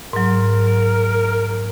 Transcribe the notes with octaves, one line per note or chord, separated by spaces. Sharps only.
G#2 F#3 A#4